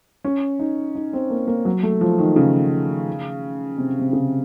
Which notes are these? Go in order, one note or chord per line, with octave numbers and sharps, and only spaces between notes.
C#4
D#4
D#4
C4
A#3
A#3
F#3
A3
F3
D#3
C#3
C3
C3
C#3